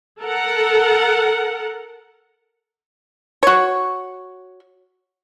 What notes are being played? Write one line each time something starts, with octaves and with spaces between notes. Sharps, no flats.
A4 A#4 F#5
F#4 C#5